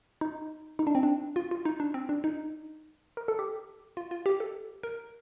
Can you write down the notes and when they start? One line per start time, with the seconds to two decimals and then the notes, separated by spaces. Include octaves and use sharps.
0.21 D#4
0.79 D#4
0.87 D4
0.95 C4
1.03 D4
1.36 F4
1.51 F4
1.65 D#4
1.80 D4
1.94 C4
2.09 D4
2.24 D#4
3.17 A#4
3.28 A4
3.39 G4
3.97 F4
4.11 F4
4.26 G4
4.40 A4
4.83 A#4